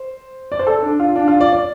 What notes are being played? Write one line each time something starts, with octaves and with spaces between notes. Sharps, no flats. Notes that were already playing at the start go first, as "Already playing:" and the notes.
Already playing: C5
D5
C5
A4
D4
F4
D4
F4
D5
D5